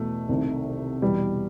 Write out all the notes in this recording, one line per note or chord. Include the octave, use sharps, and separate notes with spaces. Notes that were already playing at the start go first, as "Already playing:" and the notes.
Already playing: E2 B2 A3
C2 C3 D#3
E2 B2 G3